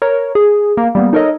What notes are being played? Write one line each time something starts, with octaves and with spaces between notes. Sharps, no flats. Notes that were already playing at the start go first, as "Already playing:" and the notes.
A#4 C#5
G#4
A#3
G3 A#3 B3
D#4 A4 A#4 C#5 D#5